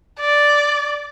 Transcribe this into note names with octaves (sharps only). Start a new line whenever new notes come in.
D5